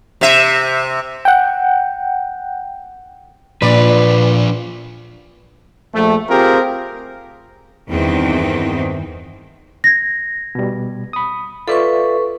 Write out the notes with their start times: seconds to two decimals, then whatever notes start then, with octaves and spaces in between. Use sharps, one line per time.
0.21 C3 E5
1.25 F#5 G5
3.62 A#2 F3 D4 B4 D5
5.94 A#1 A3
6.29 C4 F4 G4 G#4 A#4
7.90 E2 G2 D#3 E3 C4 D#4
9.84 G#6 A#6
10.55 B2 G3
11.13 B5 D#6
11.68 F4 A4 B4 D5 E5 C#6